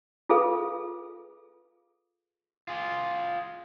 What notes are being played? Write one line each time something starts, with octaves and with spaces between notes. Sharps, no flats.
F4 G#4 A4 B4 F5
F4 G#4